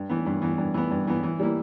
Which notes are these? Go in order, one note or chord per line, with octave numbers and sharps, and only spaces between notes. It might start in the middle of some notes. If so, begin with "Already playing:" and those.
Already playing: G2
E3 B3
G2
E3 B3
G2
E3 B3
G2
E3 B3
E3
G3 A#3 E4